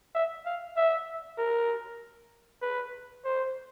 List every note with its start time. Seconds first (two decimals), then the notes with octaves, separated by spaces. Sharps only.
0.15 E5
0.46 F5
0.77 E5
1.38 A#4
2.62 B4
3.25 C5